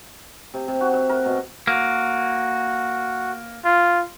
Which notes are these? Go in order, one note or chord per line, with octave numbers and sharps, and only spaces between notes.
C3
C3
F#4
E5
A#4
B2
A#3 F#4
F4